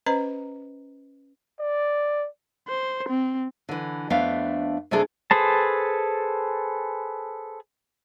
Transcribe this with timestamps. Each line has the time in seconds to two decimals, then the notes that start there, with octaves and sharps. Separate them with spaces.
0.06 C#4 B4 C5 D#5 A#5 B5
1.59 D5
2.68 C5
3.09 C4
3.69 D3 E3
4.10 F2 A3 B3 D4 F5
4.91 C3 G#3 A3 D4 G#4 A4
5.31 G#4 A4 B4 C5 A5